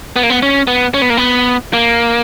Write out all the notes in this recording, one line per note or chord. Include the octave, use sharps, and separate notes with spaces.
B3
A#3
B3
C#4
B3
C#4
B3
A#3
B3
A#3